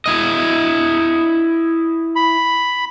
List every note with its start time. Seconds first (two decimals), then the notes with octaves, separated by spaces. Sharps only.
0.06 E4 D#5
2.16 B5